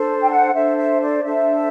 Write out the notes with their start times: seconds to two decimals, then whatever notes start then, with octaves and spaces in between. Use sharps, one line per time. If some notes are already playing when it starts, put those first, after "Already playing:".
Already playing: D4 A4 C5
0.22 G5
0.30 F#5
0.54 D4 A4 C5 E5
0.77 E5
1.00 D5
1.23 D4 A4 C5 E5